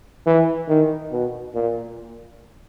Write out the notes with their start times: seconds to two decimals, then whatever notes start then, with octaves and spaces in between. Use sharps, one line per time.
0.27 E3
0.69 D#3
1.12 B2
1.55 A#2